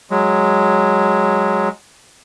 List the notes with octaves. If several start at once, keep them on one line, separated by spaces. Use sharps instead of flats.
F#3 G#3